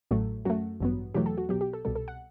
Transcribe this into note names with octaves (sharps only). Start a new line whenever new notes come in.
A1 A2 F#3 A3
F#2 F#3 A3 F#4
A1 G2 F#3 B3
E2 B2 F#3 A3 G4
A4
F#4
B1 B2 F#3 G4
G4
A4
C2 B2 G3 A4
A4
F#5